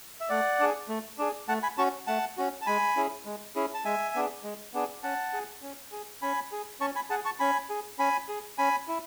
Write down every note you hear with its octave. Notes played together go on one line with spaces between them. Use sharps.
E5
A3 D5 F#5
D4 G#4
A3
D4 G#4
A3 F#5 A5
G#5 B5
C#4 F#4 A5 C#6
A3 F#5 A5
C#4 F#4
A5
G#3 G#5 B5
C#4 E4 G#4
G#3
C#4 E4 G#4
A5
G#3 E5 G#5
B3 D4 G#4
G#3
B3 D4 G#4
C#4 F#5 A5
G#4
C#4
G#4
C#4 G#5 B5
G#4
C#4 A5 C#6
G#5 B5
G#4 F#5 A5
A5 C#6
C#4 G#5 B5
G#4
C#4 G#5 B5
G#4
C#4 G#5 B5
E4